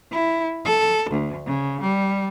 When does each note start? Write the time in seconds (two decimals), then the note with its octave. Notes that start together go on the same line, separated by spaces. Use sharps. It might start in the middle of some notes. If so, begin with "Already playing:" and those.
0.12 E4
0.65 A4
1.10 D2
1.47 C#3
1.81 G3